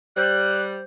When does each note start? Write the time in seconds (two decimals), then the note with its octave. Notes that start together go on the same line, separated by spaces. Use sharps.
0.17 G3 C5 F#6 G6